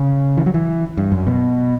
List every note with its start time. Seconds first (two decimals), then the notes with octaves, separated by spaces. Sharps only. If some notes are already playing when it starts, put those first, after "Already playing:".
Already playing: C#3
0.37 E3
0.46 F#3
0.54 E3
0.97 G2
1.12 F#2
1.27 B2